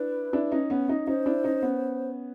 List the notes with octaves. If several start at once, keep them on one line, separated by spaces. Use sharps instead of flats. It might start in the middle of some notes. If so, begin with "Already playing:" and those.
Already playing: D4 E4 B4
D4 E4
C#4 D#4
B3 C#4
C#4 D#4
C#4 D#4 C5
D4 E4
C#4 D#4
B3 C#4